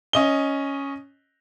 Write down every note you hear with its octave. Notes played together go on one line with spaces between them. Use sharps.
C#4 D#5 G7